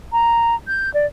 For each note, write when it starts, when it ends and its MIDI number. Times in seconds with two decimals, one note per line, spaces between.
0.12 0.55 82
0.67 0.92 91
0.94 1.06 74